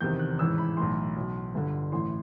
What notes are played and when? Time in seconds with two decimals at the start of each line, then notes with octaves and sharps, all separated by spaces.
0.01 F1 E2 C3 D#3 G6
0.19 F#6
0.39 A1 G#2 E3 E6
0.58 B5
0.77 B1 A2 E3 C6
1.16 B1 B2
1.54 G1 G2 D3
1.92 A1 A2 E3 C6